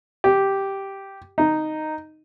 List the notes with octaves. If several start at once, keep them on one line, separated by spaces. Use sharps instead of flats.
G4
D#4